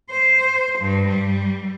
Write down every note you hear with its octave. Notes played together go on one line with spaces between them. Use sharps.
C5
G2
G3